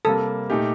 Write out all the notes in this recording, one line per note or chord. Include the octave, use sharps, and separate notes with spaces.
C3 G3 A#3 A4
A#2 A3 D#4 G4